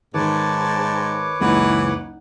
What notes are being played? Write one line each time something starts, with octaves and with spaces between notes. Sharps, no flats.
G#2 D#3 B4 C#5 A5 D6
F#1 C#2 E3 D#4 F#5